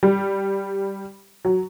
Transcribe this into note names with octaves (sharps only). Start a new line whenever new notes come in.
G3
F#3